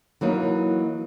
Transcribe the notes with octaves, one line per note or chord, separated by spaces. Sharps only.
E3 F#3 A#3 D#4